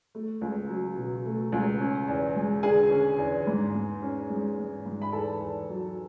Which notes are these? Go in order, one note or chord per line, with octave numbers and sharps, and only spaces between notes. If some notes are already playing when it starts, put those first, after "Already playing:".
A3
C#2
F#3
B2
A3
C#2
C#4
E2
G#3
D3 G#4 G#5
C#4
E2
G#2
G#2
C#4
G#3
G#2
G#2
B5
E2 A4 A5
E2
F#3